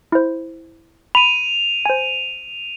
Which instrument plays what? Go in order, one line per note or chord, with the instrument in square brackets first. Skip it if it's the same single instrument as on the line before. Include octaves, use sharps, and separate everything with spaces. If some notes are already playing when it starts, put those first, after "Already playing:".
[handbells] E4 C5
[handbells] B5 [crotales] D#7 F7
[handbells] C5 G#5